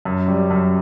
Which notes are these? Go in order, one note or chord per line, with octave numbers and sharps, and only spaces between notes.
F#2
G3
F#2